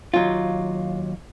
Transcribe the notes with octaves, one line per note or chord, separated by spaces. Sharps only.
D#2 F#3 F4